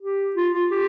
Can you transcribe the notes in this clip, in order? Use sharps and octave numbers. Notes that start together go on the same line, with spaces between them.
G4
F4
F4
G4